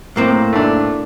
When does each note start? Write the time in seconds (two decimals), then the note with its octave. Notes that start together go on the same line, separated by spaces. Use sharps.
0.16 A2 A#3 C4
0.53 A3 D4